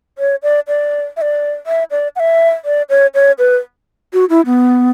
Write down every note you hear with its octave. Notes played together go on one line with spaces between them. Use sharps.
C#5
D5
D5
E5
D5
E5
D5
F#5
E5
D5
C#5
C#5
B4
F#4
E4
B3